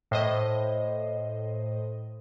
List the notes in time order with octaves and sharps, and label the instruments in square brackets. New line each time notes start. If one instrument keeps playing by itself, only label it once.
[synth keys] A2 C5 D#5